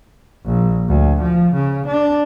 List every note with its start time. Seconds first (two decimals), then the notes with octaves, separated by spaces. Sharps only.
0.45 A#1
0.88 D2
1.22 F3
1.54 C#3
1.87 D4